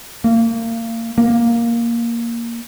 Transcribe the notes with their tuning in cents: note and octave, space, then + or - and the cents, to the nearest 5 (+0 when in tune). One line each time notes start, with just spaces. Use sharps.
A#3 -30
A#3 +5